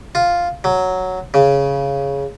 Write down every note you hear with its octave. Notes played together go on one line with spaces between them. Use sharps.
F4
F#3
C#3